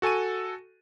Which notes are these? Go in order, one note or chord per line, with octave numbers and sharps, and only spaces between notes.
F#4 A4 G#5 C#6 D#7